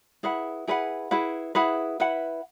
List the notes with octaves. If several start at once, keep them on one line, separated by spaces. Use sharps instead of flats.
E4 G#4 B4 F#5
E4 G#4 B4 F#5
E4 G#4 B4 F#5
E4 G#4 B4 F#5
E4 B4 F#5